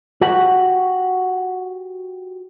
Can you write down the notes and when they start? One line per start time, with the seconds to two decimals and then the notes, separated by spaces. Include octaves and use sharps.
0.21 F#4 G4 F#5